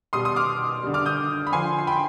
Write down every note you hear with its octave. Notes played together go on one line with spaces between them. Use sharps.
B2 G3 C6 D#6
C6 D#6
D6 F6
D3 G3
D6 F6
D#6 G6
B5
D3 F3 G#5 C6
C6
G5 B5